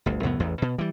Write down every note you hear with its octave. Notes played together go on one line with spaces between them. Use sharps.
G1 D2
C2 F2 A2 B3
A1 E2
B2
E3 G3